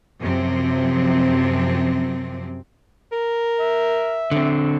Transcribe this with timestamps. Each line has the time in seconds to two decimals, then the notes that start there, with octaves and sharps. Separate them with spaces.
0.20 F#2 C3 F3 C4
3.12 A#4
3.60 E5
4.31 D3 C4